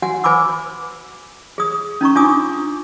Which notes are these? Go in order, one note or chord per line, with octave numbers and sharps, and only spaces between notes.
F#4 F#5 G#5
B4 G#5 B5 D6 E6
G#4 D#6
C#4 D#4 A#5 C#6
D4 F4 G#5 D6 D#6